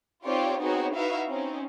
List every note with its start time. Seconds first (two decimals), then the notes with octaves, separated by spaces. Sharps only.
0.24 C4 D#4 F4 G4 C#5 D5
0.59 B3 C4 D#4 F#4 G#4 C#5
0.94 D#4 E4 F#4 B4 E5 F5
1.28 C4 C#4 D#4